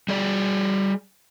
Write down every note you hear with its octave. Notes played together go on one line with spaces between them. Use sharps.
G3 G#4 D5